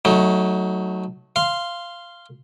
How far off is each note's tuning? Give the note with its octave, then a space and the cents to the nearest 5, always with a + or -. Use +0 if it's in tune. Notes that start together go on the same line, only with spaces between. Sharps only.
F#3 +10 A3 +0 D#4 +30
F5 -10 C6 +0